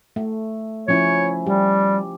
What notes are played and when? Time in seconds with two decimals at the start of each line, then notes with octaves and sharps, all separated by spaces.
0.16 A3
0.88 F3 C#4 E4 C#5
1.46 G3 G4